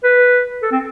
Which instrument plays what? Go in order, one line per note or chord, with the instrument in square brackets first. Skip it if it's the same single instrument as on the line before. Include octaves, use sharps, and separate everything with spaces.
[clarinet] B4
A4
C4